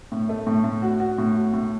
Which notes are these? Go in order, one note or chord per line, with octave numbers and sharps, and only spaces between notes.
A2
A3
A2
A2
F#4
F#4
A2
F#4
A2